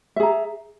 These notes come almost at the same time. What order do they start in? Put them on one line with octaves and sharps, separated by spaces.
E5 G#4 A#5